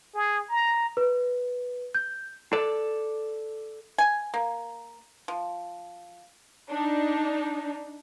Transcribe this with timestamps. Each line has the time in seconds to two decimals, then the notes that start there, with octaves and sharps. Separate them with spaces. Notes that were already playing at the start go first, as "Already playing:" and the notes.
0.15 G#4
0.49 A#5
0.97 B4
1.95 G6
2.53 A4 D5
3.98 G#5
4.34 A#3
5.28 F3
6.70 D4 D#4